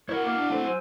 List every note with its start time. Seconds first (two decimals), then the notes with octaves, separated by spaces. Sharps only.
0.09 E4 F#4 A#4 C#5
0.25 A#3 F5 D6
0.37 D4
0.50 A3 C4
0.65 F#3 C5 G#5 E6